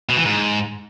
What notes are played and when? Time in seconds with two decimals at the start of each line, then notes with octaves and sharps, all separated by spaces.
0.09 B2
0.17 E3
0.25 G#2